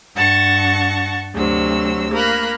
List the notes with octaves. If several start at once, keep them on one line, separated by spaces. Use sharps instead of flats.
G2 F#5 A5 C#6 A#6
D2 C3 F#3 E6
A#3 A#4 B5 F#6